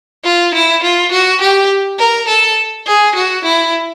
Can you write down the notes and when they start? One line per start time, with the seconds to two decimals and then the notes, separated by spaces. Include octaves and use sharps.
0.24 F4
0.54 E4
0.82 F4
1.11 F#4
1.41 G4
1.99 A#4
2.28 A4
2.87 G#4
3.15 F#4
3.44 E4